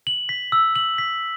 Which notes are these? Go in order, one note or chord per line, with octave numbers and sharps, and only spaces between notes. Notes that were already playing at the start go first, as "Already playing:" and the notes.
F#7
B6
E6
F#7
B6